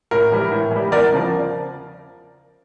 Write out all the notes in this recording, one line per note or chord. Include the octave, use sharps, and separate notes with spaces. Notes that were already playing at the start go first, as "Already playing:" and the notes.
A2 A#4
E3 G3
A2
E3 G3
E2 A#4 D5
C#3 F3